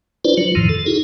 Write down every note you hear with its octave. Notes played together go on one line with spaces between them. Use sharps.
D4 E4 F4 B4 C5 D5
F#3 F4
F2 A2 D#3 F3
A4
D#4 E4 F#4 G#4